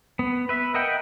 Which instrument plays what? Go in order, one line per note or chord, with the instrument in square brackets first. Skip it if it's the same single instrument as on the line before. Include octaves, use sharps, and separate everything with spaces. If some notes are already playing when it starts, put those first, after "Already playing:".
[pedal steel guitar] B3
B4 E5
A#4 D#5 E5 F#5 G5